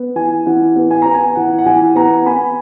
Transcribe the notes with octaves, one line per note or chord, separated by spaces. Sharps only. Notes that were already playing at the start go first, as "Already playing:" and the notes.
Already playing: B3
E3 G#5
E3 F#5
B3
G#5
B3 A#5
G#5
E3 F#5
F#5
E3 G#5
B3 F#5 A#5
B3 G#5 B5